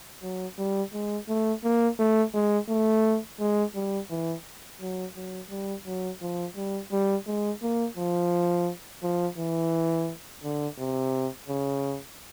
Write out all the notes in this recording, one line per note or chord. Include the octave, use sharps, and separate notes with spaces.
F#3
G3
G#3
A3
A#3
A3
G#3
A3
G#3
G3
E3
F#3
F#3
G3
F#3
F3
G3
G3
G#3
A#3
F3
F3
E3
D3
C3
C#3